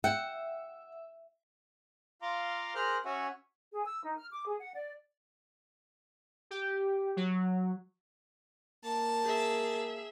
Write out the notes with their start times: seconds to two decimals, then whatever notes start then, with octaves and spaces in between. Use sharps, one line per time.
0.04 E5 F#5 G5
2.22 F4 F5 A#5 C6 D6
2.75 G#4 A#4 C5 A#5 F6 F#6
3.05 C#4 F#4 C#5 E5 F#5 G#5
3.72 G#4
3.85 E6
4.03 D#4
4.17 F6
4.32 D6
4.45 G#4
4.59 F#5
4.74 D5
6.51 G4
7.17 F#3
8.84 A#3 A5
9.25 G#4 E5